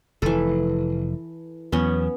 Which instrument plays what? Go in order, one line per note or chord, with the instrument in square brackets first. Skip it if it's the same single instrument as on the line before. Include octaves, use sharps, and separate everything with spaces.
[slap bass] F1 [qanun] E3 A4
[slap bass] E2 F#3 [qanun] B3 C#4